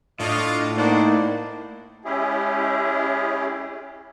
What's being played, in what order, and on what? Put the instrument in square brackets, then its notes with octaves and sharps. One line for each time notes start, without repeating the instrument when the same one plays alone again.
[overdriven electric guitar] A2 [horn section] D4 F4 D#5
[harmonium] A#3 D#4 [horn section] D4 C5 F#5
[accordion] G#3 C#4 E4 G4 G#4